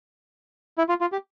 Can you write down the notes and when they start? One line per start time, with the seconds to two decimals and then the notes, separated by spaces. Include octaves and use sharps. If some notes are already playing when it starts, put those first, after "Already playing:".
0.78 E4
0.89 F4
1.01 F4
1.12 G4